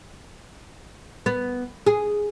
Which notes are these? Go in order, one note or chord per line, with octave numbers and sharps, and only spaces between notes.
B3
G#4